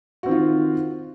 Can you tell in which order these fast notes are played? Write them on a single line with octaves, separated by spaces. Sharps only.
F#4 C4 D#3 F4